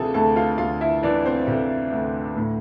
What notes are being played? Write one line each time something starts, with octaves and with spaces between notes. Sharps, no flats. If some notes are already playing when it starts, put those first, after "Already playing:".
Already playing: D2 C3 E3 E4 F4 G#4 A4 A5
D2 A4 A5
F4 F5
D2 F4 F5
E4 E5
E3 D4 D5
C4 C5
C3 A4
D2
A2